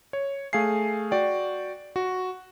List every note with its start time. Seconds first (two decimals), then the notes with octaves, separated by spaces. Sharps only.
0.13 C#5
0.53 A3 G#4 F5 G#5 C7
1.11 F#4 D5 G5
1.96 F#4